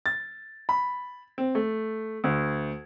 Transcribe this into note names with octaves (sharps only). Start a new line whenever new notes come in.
A6
B5
C4
A3
D2